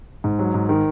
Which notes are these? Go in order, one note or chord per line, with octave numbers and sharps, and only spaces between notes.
G#2
F#3
G#2
D#3